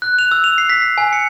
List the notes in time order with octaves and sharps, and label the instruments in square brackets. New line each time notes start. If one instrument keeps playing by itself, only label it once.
[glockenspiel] F#6
F7
E6
F7
C7
B6
C7
G#5
C#7